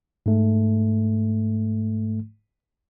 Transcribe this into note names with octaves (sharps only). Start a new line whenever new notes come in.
G#2 A3